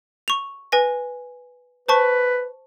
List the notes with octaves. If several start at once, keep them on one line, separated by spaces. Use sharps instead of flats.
C#6 F7
B4 G#5 A#6
B4 C5 A5 C#6